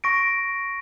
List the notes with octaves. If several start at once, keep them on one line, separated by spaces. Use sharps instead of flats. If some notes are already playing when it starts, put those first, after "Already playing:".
C#6 A#6 D7